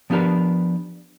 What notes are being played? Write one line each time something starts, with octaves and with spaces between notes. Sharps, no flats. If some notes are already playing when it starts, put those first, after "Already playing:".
F3 B3 D4 G4 A#4 B4